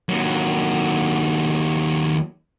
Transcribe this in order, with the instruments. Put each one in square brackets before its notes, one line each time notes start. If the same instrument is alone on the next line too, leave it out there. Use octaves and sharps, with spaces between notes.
[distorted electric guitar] D#2 F#3